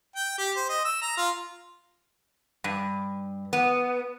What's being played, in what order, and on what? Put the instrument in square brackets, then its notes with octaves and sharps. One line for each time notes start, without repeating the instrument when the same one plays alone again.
[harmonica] G5
G4
C5
D#5
E6
A#5
F4
[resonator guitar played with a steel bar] G2
B3